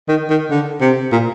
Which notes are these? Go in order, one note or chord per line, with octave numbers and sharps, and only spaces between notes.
D#3
D#3
D3
C3
A#2